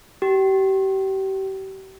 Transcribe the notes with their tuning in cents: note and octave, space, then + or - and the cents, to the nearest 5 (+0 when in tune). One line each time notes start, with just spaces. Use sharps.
G4 -35